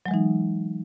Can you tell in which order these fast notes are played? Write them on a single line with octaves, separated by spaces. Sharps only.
F#3 G#3 E3 D#4